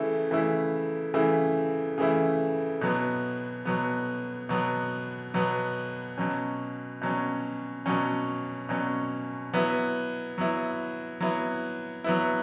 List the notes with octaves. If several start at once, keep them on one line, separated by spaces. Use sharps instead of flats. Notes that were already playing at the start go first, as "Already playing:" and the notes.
Already playing: C#3 E3 A3 E4
C#3 E3 A3 E4
C#3 E3 A3 E4
C#3 E3 A3 E4
B2 F#3 B3
B2 F#3 B3
B2 F#3 B3
B2 F#3 B3
B2 F#3 C#4
B2 F#3 C#4
B2 F#3 C#4
B2 F#3 C#4
F#3 B3 E4
F#3 B3 E4
F#3 B3 E4
F#3 B3 E4